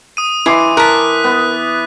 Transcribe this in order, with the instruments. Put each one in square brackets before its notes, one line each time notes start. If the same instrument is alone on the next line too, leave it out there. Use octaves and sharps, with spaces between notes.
[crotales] D#6 D#7
[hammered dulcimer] E3 C6 D6 [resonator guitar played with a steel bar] E4
[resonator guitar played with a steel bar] A#4 A5 [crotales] F#6 B6
[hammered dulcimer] B3